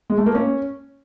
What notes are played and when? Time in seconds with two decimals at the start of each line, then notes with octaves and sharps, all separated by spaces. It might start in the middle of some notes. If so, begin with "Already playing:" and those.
0.10 G#3
0.18 A3
0.26 A#3
0.35 C#4